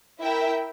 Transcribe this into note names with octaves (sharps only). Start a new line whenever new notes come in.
E4 A#4 E5 G5